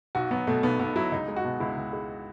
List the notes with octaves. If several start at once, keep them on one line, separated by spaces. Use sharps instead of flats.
B1 F#4
F#3 B3
B2 A3
B1 B3
B1 B3
F#3 E4
C#2 D#4
G#3
F#4
B2
C#2 E4
C#2
G#3